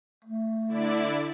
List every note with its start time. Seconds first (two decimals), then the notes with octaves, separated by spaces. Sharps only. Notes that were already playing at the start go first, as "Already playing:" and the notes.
0.25 A3
0.67 D3 E4 D5